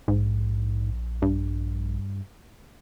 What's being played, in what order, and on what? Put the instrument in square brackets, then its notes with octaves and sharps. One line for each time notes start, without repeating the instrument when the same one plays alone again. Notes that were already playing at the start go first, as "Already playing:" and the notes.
[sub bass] A#1 [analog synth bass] G#2
[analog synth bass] G2